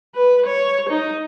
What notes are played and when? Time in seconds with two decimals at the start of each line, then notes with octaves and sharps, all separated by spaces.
0.15 B4
0.47 C#5
0.90 D#4